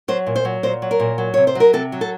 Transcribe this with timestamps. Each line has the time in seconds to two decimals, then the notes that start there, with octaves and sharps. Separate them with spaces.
0.08 F#3 C5
0.26 A#2
0.36 C5
0.45 F#3
0.63 A#2 C5
0.82 F#3
0.91 A#4
1.00 A#2
1.18 F#3
1.34 C3 C#5
1.47 C5
1.55 F#3 A#4
1.73 C3 A4
1.92 F#3
2.01 A4